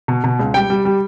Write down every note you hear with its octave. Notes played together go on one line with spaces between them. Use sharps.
B2
B2
C#2
G3 G5
G3
G3